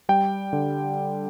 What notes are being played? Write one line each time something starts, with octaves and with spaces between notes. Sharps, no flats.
G3 G5
D3